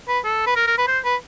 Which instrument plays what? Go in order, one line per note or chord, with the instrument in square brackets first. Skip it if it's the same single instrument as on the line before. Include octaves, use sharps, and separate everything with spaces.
[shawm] B4
A4
B4
A#4
A#4
B4
C5
B4